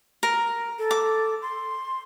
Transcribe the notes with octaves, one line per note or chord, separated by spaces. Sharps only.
A#4
A4
D6
C6